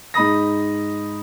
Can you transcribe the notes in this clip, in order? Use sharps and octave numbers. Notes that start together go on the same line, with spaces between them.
G#2 D#4 B5 D#6 A#6